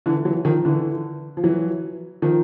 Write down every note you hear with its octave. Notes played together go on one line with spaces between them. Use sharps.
D3 E3
E3 F#3
D#3 F3
D3 E3
F3
E3 F#3
D#3 F3